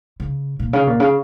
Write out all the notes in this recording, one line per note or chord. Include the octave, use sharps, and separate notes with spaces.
C#3
A#2
C#3
A#2
C#3